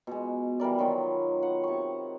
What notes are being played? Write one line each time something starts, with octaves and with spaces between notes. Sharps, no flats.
B2 G#3
E3 G3 A#4 D5
D#3 F#3 B3 F4
F#5
C3 C#6